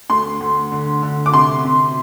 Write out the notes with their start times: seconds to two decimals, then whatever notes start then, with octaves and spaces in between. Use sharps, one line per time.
0.10 D2 C6
0.41 D2
0.72 D3
1.02 D3
1.26 D6
1.33 C3 C6
1.64 C3